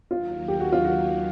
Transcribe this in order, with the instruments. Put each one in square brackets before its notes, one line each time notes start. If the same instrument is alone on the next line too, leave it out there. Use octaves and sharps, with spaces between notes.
[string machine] D#2 D#3 F#3 [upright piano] F4
[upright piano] G4
F#4
F4
F#4